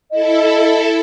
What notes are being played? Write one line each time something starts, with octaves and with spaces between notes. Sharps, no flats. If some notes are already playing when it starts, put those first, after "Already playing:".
E4 A4 D#5